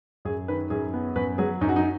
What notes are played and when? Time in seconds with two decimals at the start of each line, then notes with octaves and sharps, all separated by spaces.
0.25 F#2 G#4
0.48 D#3 B4
0.70 F#2 G#4
0.94 B3
1.16 F#2 B4
1.38 F#3 G#4
1.61 F#2 D#4
1.69 F#4
1.76 D#4